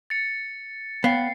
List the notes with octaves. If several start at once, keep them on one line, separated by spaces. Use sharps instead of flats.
A6 C#7
B3 C#5 F5 G5 C7